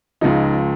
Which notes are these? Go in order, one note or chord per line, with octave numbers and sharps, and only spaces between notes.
C#2 C#3 F3 D#4